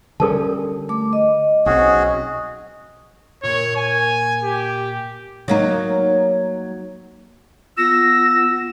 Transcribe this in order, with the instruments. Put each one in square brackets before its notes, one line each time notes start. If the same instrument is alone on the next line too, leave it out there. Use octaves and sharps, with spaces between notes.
[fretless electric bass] D3 G3 C#4 [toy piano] A4 A#4 A5
[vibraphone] A3 D6
D#5
[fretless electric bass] B1 C4 [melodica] C#4 F#4 G#4
[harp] A#2 [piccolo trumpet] C#5
[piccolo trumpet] G#5
G4
[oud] F#3 A#3 D#4
[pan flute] B3 [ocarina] F4 [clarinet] E6 [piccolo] A#6